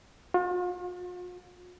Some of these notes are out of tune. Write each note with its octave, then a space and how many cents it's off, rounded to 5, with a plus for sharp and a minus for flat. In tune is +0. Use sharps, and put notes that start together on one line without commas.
F4 +45